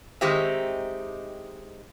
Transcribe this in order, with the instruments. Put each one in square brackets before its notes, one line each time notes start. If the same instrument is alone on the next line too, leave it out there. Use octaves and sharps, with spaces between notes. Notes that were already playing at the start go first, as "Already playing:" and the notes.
[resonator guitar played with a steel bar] D#3 G#3 C4 D#4 G4 E5